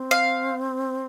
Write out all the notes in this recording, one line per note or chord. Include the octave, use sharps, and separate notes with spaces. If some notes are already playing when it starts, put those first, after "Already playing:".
Already playing: C4
F5